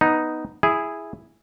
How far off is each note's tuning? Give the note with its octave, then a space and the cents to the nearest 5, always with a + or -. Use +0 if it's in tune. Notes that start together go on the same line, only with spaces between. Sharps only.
B3 +0 D#4 +0
E4 +0 G#4 -5